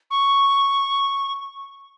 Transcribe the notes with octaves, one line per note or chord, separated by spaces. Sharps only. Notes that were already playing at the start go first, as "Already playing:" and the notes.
C#6